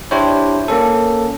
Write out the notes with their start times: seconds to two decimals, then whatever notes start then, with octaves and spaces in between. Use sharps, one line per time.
0.11 D4 E4 G4 C5 C#5
0.68 A#3 C#4 A4